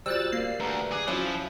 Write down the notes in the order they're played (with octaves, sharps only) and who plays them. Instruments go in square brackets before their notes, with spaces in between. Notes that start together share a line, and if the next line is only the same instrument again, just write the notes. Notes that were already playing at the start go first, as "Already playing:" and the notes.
[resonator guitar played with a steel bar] G3 [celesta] F4 F#4 C5 [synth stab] E6 F#6 A6
[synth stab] A#3 C7
[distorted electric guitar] D2 [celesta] B4 A#5
[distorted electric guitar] G#4 [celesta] D6 F#6
[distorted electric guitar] F3 [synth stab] F#3 [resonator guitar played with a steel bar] C#4 E4